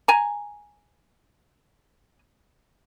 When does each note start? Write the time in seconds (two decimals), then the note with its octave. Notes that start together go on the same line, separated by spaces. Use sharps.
0.08 G#5 A#5